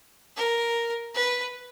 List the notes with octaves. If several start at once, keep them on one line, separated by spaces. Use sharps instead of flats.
A#4
B4